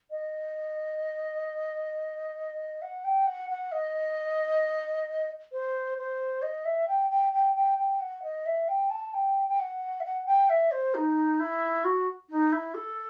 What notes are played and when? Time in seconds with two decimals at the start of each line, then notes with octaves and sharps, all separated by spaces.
0.11 D#5
2.82 F#5
3.04 G5
3.27 F#5
3.50 F#5
3.72 D#5
5.52 C5
5.98 C5
6.42 D#5
6.65 E5
6.88 G5
7.10 G5
7.33 G5
7.55 G5
7.78 G5
8.00 F#5
8.23 D#5
8.46 E5
8.68 G5
8.90 A5
9.14 G5
9.49 G5
9.59 F#5
10.00 E5
10.04 F#5
10.26 G5
10.49 E5
10.71 C5
10.95 D#4
11.40 E4
11.84 F#4
12.30 D#4
12.52 E4
12.74 A4